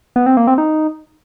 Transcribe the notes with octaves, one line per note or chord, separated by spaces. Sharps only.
B3
C4
A#3
C4
D#4